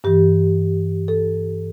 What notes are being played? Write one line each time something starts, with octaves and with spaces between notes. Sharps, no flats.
G2 E3 G4
A4